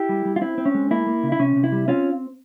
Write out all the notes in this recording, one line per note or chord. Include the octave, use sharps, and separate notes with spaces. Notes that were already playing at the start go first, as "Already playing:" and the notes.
Already playing: E4 G4
G3
G3
F4
C4 E4
C4
C#4
G#3
A#3 E4
A#3
C#3
E4
C3 C#4
C3
E4
G3
C4 C#4 F4